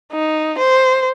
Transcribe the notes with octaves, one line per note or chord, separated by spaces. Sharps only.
D#4
C5